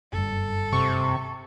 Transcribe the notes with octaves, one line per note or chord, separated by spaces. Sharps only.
F#1 G2 A4
C3 C#6